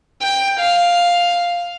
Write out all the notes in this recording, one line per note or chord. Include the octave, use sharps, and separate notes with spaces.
G5
F5